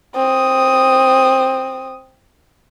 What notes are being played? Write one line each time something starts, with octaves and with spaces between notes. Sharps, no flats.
C4 D#6